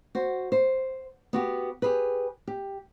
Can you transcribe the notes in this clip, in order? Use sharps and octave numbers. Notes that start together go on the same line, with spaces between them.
F#4 C5
C5
B3 F#4 G4
G4 G#4 B4
G4